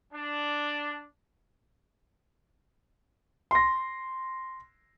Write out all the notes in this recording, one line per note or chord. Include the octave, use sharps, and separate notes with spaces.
D4
C6 A#6